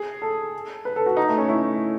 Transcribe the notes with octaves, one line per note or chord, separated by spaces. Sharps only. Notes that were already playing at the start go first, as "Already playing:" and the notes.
Already playing: G#4
A4
B4
A4
F#4
D#4
A3
C#4
E4